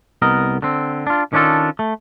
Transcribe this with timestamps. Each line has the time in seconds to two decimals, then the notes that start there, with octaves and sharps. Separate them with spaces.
0.22 C2 B3 A#4 D#5
0.62 D3 C4
1.07 D4 F4
1.33 D#3 C#4 D4 F4 A4
1.79 A3